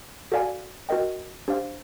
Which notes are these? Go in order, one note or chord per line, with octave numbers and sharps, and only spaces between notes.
F#4 A4 D5 F5 G#5
F#4 A#4 D#5 G5
D4 G4 C5 F5